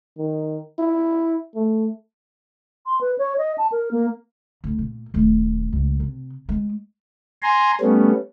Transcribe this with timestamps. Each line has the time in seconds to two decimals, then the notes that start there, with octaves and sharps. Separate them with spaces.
0.18 D#3
0.79 E4
1.55 A3
2.86 C6
3.01 B4
3.18 C#5
3.38 D#5
3.58 A5
3.72 A#4
3.91 A#3
4.64 D2
4.79 A#2
5.14 D#1 A3
5.73 C#2
6.00 C3
6.49 G#3
7.42 G#5 A#5 C6
7.81 G3 A3 B3 C#4